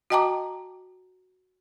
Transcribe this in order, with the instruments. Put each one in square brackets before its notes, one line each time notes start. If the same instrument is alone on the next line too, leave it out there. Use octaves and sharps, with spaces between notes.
[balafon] F#4 D#5 G5 A5 A#5 D6